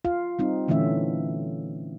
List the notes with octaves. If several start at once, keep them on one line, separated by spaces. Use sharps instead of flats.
F4 F5
G3 C4 D#4
A#2 D3 E3 A3 C#4 E5